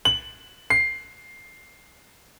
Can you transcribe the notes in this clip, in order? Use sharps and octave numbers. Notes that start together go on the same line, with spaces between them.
F#7
C7